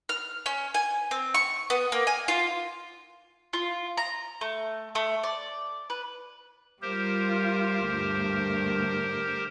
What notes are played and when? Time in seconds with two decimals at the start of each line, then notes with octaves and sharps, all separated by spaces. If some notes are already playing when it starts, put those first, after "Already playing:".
0.09 F6
0.46 C#4
0.74 G#5
1.11 C4
1.34 C#6
1.70 B3
1.92 A#3
2.07 G#5
2.28 F4
3.53 F4
3.97 A#5
4.41 A3
4.95 A3
5.23 D5
5.90 B4
6.82 G3 F4 G4 A#4 C5
7.88 D2 G2